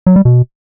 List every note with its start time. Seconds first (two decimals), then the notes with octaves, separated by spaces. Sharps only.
0.07 F#3
0.16 G3
0.25 B2